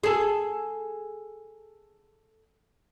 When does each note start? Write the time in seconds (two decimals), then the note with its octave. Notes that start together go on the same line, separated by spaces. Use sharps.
0.03 G#4 A4